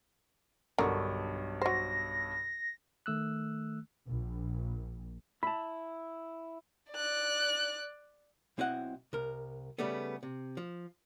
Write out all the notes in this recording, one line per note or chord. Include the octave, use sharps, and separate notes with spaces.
B1 G2 D3 A#4 C#6
F#3 C5 A#6
D#3 A3 E6 F#6
A#1
E4 A5 B5
D5 F#6
B1 C4 E4 D#5 F#5
C2 A#4
C#3 G3 A3 B3
C3
F3